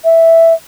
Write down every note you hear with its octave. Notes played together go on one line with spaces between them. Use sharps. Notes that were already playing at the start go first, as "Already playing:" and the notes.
E5